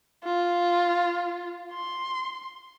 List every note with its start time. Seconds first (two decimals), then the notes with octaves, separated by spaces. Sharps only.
0.24 F4
1.73 C6